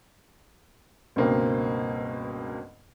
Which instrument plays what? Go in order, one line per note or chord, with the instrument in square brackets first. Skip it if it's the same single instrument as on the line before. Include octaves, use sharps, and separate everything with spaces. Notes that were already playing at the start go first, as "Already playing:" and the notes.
[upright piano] C#2 G2 B2 A#3 C4